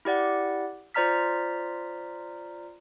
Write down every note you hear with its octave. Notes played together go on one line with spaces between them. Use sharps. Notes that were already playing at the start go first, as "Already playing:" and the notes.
E4 G4 D5 F#5
F4 C5 D5 A#5 F6 B6